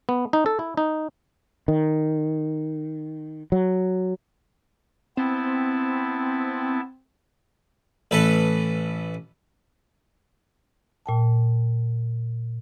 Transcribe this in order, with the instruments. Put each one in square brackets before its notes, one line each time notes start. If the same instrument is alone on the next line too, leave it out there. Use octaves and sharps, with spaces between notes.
[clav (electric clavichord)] B3
D#4
A4
E4
D#4
[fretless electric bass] D#3
F#3
[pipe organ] B3 E4 A5 [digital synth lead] C4
[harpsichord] A1 A4 B4
[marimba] A#2 G5 A5